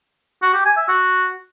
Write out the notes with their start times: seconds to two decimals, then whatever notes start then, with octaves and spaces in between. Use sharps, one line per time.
0.42 F#4
0.54 G4
0.65 G#5
0.77 E5
0.88 F#4